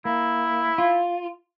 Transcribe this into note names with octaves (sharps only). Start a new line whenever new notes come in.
A#3 E4
F4